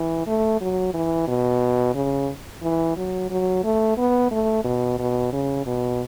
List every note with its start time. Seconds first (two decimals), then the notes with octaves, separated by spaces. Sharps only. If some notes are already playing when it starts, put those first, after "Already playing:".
Already playing: E3
0.27 A3
0.61 F#3
0.94 E3
1.28 B2
1.95 C#3
2.62 E3
2.97 F#3
3.30 F#3
3.64 A3
3.97 B3
4.31 A3
4.64 B2
4.99 B2
5.33 C#3
5.66 B2